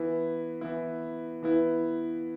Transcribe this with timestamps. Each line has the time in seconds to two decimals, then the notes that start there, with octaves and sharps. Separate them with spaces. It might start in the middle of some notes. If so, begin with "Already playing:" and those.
Already playing: E3 B3 E4
0.61 E3 B3 E4
1.43 E3 B3 E4